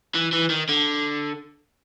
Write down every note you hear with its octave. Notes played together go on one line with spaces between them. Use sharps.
E3
E3
D#3
D3